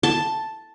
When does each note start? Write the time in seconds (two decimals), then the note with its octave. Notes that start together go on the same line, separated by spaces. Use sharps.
0.03 A5